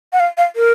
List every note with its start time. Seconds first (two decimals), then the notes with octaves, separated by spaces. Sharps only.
0.13 F#5
0.20 F5
0.38 F5
0.56 A#4